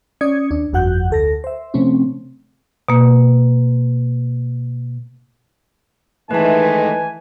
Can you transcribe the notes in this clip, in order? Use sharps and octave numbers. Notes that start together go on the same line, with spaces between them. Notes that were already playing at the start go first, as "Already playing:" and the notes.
C#4 D5 D#6 G#6 C#7
D#2 D4
G1 F2 F#4 F#5 F#6 G6
D2 A4 A#6
C5 E5
C3 F3 A3 C4 C#4
B2 A#3
D#3 E3 G#3 A3 B4 G#5 A5